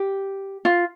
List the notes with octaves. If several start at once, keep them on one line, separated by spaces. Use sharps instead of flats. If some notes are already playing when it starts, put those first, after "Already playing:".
Already playing: G4
F4